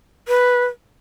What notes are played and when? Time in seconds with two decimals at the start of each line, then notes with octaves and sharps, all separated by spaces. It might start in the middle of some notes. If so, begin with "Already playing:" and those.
0.28 B4